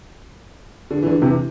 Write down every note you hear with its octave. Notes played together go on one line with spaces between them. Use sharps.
D3
E3
D3
C3 E3